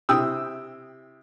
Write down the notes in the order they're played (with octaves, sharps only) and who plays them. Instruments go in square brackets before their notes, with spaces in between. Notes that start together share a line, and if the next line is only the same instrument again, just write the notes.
[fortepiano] C3 E4 G5 D#6 E6